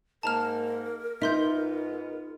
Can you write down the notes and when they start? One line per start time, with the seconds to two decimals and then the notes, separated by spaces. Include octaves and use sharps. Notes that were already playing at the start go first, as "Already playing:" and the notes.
0.23 G#2 A#3 A#4 A5 A#5 F6
1.22 G#2 B3 D#4 F4 E5 C6 G6